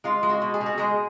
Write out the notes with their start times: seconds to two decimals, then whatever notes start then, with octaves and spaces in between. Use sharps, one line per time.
0.04 G#3 F4
0.23 G#3
0.29 F#4
0.42 B2
0.54 G#4
0.61 B2
0.66 F#4
0.78 G#3 G#4